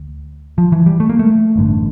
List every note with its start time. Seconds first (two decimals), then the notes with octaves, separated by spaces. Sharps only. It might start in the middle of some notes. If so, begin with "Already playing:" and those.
Already playing: D2
0.58 F3
0.72 E3
0.86 G3
1.00 A3
1.09 A#3
1.19 A3
1.56 A1 G2 D3